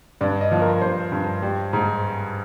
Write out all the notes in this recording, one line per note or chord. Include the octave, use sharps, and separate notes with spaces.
G2 D5
D#5
F3
A#4
G2 C5
G2
G3
G#2